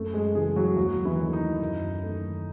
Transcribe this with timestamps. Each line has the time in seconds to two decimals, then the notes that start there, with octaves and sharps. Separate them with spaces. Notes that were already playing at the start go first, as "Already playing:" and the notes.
Already playing: F#2 A3 A4
0.13 G#3 G#4
0.34 C#3 E3 G#3 G#4
0.56 F#3 F#4
0.77 D#2 F#3 F#4
1.05 E3 E4
1.19 D#3 F#3 A3
1.33 D#4
1.61 F#2
2.04 D#3 A3